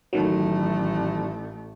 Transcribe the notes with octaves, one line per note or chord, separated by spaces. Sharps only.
A1 D#3 F#3 A3